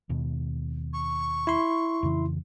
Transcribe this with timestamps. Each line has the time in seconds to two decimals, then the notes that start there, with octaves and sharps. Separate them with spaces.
0.09 D#2 B2
0.93 C#6
1.47 E4 C6
2.03 F2 C#3 E3